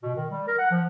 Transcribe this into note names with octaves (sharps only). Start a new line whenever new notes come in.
B2
D#3
G3
A#4
F#5
F3